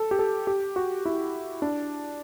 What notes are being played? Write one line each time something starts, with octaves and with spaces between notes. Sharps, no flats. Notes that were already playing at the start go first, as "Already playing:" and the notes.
Already playing: A4
G4
A4
G4
F#4
E4
D4